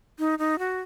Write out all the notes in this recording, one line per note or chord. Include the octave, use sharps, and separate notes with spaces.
D#4
D#4
F#4